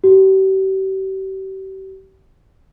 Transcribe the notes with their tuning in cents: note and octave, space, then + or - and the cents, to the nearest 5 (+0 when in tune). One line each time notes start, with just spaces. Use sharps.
G4 -40